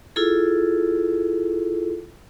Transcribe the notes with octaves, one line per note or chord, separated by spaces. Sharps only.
E4 F4 G#4 A4